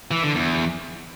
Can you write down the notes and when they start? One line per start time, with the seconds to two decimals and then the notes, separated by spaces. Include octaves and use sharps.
0.11 E3
0.23 D3
0.35 E2